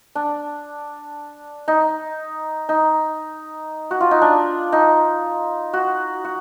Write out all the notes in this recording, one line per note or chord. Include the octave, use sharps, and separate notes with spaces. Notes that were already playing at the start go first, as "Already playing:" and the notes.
D4
D#4
D#4
F#4
F4
D#4
D4
D#4
F#4
F#4